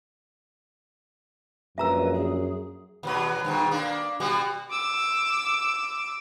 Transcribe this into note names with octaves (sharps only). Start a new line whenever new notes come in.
A#1 F#2 B4 E5 A#5 E6
G#4
D#2 B2 F#3
G2 B2 D#3
A#3 D4
B2 G3 F#4
D6 E6